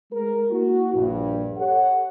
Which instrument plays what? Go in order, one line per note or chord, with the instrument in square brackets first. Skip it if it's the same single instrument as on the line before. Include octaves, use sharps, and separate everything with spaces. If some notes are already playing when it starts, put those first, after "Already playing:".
[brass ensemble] G#3 A#4
A#3 E4 F#4
A#1 G2
G4 A4 C#5 F#5